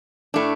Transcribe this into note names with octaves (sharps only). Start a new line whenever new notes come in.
A2 A3 D4